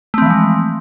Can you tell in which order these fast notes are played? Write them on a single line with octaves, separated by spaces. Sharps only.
A3 C4 E3 F3 G#3